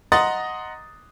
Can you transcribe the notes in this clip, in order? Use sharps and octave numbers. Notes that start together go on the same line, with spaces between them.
D#5 F#5 A#5 C6 D#6 A6